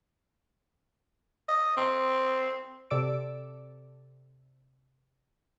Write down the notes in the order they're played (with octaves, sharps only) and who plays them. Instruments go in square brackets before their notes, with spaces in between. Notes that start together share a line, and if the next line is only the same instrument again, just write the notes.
[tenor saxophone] D#5
C4
[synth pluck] C3 A4 D5 D6 E6 D7